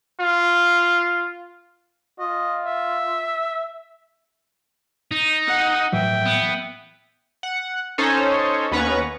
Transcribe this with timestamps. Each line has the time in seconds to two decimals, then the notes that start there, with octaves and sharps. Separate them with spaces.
0.21 F4
2.19 F4 D#5
2.65 E5
5.11 D#4
5.48 F#5
5.93 A2 E3 F#3 E5 G5
6.26 B3
7.43 F#5
7.98 C#4 D#4 A4 C5 C#5
8.72 D#2 B3 C#4 B4 A#5 C#6